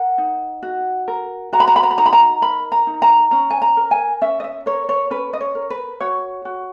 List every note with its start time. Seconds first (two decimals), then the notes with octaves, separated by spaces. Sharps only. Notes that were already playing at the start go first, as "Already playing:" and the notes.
Already playing: A#4 F#5
0.18 D#4
0.63 F#4
1.08 A#4
1.53 F#4 A#5
1.60 B5
1.68 A#5
1.76 B5
1.83 A#5
1.91 B5
1.97 D#4 A#5
2.06 B5
2.13 A#5
2.42 A#4 B5
2.72 A#5
2.87 D#4
3.02 A#5
3.31 C#4 A#5
3.51 G#5
3.62 A#5
3.77 A#4
3.91 G#5
4.21 C#4 E5
4.40 D#5
4.44 E5
4.66 A#4 C#5
4.89 C#5
5.10 C#4 B4
5.33 D#5
5.41 C#5
5.55 A#4
5.70 B4
6.00 F#4 C#5
6.45 F#4